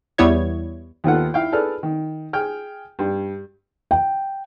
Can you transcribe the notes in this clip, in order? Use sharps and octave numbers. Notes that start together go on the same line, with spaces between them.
E2 G3 B3 E4 C#5 G#6
D#2 D#3 B3 F4 A4 F#5
E4 F5 G5
G#4 A4 B4 D5 F6
D#3
G#4 G5 F6
G2
G5